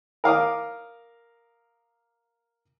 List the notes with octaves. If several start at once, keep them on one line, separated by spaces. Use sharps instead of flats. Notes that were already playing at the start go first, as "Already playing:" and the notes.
A#4 F5 D6 D#6